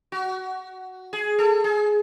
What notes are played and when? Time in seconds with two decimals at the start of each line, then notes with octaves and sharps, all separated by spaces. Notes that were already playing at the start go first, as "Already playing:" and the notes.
0.12 F#4
1.13 G#4
1.39 A4
1.64 G#4